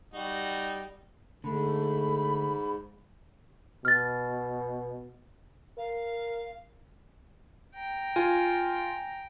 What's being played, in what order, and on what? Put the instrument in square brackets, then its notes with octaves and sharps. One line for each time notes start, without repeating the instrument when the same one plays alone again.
[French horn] G3 [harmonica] D#4 F#4
[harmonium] G#2 [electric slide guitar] D3 [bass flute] A3 [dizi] B5
[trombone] B2 [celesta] F6 A6
[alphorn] A#4 [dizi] F5
[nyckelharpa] G5 A#5
[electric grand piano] F4 [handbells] G#5